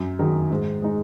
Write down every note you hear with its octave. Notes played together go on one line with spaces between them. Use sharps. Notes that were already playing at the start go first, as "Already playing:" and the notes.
Already playing: F#2
D#3 F#3 D#4
G#2
G#3 D#4